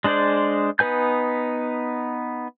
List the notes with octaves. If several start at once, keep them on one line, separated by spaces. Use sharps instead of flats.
G#3 D4 G#4 C5 D5
B3 D#4 B4 G#5 G6